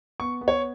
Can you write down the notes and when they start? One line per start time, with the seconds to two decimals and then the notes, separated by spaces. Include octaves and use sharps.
0.20 B3 C#6
0.41 B3
0.48 C#5